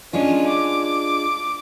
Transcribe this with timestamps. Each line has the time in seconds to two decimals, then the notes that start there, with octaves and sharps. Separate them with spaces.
0.13 G#3 C#4 D4 F4
0.46 D6